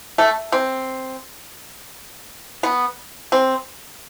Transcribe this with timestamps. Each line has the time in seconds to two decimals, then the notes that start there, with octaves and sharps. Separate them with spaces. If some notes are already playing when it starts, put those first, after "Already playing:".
0.18 A3
0.52 C4
2.63 B3
3.32 C4